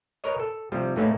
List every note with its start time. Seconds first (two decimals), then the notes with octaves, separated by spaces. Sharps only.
0.24 A#4 B4 C#5 D#5
0.40 A4
0.72 C3 F3 G3
0.96 A2 E3 A3 A#3 C#4 D#4